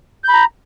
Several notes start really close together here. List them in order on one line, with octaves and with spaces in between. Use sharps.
G6 B5 A#5